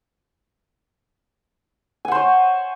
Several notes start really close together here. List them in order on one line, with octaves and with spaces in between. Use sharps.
G#5 F#5 C5 C#5